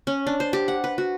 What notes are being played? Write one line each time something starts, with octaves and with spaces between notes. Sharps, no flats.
C#4
D4
C5
G4
F#5
B4
F#4